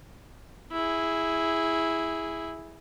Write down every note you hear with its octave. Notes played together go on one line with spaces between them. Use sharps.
E4 G#4